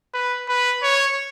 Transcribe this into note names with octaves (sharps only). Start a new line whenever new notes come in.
B4
B4
C#5